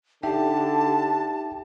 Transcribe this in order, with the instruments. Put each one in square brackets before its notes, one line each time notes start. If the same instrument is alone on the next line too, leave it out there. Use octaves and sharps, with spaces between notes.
[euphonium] D3 [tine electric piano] D#4 E5 G5 [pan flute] G4 [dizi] A5